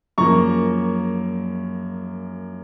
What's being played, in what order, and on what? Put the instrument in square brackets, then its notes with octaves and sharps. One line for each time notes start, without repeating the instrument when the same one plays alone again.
[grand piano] F#2 C#3 F3 A#3 A#5 C#6